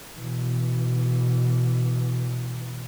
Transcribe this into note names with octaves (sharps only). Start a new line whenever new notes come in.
B2 E3